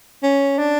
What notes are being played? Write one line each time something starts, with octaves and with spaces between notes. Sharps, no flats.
C#4
D4